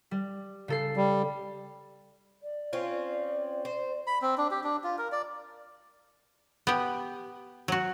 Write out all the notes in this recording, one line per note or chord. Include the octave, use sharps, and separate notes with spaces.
G3
C#3 A4 C7
G3
D5
C4 C#4 F4
C5
B5
C4
D4
G4
D4
F4
A#4
D5
B3 G4
F#3 F#4